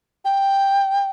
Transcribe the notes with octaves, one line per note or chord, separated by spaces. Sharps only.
G5